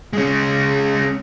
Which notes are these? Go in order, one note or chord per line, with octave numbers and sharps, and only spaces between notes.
G#3 C#4